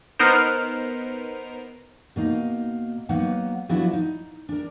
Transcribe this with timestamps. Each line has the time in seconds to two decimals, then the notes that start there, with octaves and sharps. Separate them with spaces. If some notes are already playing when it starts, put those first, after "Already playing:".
0.19 B3 D#4 A#4 C5
2.16 B2 A#3 D#4
3.09 F#3 A#3 B3 D#4 F#5
3.69 F3 F#3 B3 D4 E4 F#4
3.93 D#4
4.49 D4 A#4